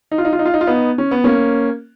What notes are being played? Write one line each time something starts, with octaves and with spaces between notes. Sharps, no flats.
D#4
F4
D#4
F4
D#4
F4
D#4
F4
B3 D#4
C#4
B3
A#3 C#4